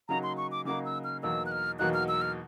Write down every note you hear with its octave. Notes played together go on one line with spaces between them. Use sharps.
C#3 F#3 A#3 D#4 F#4 A#5
C6
C#6
D6
C#3 F#3 A#3 D#4 F#4 D6
E6
F6
E2 B2 F#3 A#3 D#4 E6
F#6
F6
E2 B2 F#3 A#3 D#4 F#6
F6
E6
F6